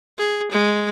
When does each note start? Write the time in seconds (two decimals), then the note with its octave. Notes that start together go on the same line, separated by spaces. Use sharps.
0.18 G#4
0.51 G#3